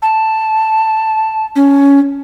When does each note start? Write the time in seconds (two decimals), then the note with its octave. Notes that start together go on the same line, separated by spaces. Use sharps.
0.02 A5
1.56 C#4